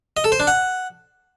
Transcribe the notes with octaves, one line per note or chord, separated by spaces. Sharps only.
D#5
A4
C5
D4
F#5